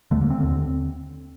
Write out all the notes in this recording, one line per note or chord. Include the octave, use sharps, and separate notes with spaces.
D#2 D3 A3
A#3
C4
D#2 D3 C4